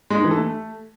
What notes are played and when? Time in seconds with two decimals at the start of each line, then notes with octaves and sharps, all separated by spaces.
0.10 G#3
0.17 D#4
0.24 E3
0.31 A4
0.38 A3